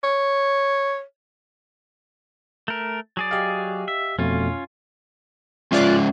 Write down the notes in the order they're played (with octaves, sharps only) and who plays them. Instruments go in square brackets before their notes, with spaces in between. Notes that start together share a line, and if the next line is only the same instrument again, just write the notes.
[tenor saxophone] C#5
[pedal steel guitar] A3 A#4
F#3 G#4 D5
[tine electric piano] G4 D#5 F5
[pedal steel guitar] E5
[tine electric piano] F2 B2 A3 [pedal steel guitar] C#4 F4
[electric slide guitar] G#3 C#4 E5 [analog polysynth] F4 D5 F#6